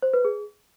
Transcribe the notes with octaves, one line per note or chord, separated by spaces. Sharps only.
C5
B4
G#4